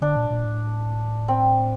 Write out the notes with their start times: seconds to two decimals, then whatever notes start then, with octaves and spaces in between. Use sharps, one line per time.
0.01 D3 D4
0.16 A#2
0.30 A#2
0.44 A2
1.28 C4